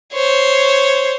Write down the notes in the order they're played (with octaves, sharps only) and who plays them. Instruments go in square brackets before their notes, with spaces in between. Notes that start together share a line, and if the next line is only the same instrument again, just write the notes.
[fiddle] C5 C#5